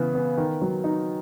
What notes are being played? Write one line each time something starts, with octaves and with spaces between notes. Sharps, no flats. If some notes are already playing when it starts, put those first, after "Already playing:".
Already playing: C#3 E3 B3
B3
D#3
F#3
D#4